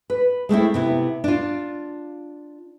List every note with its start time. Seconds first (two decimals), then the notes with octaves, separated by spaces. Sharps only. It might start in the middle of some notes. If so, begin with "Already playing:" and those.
0.10 B4
0.49 G#3 A3 C4 E4
0.74 C3 B3 E4
1.24 D4 F4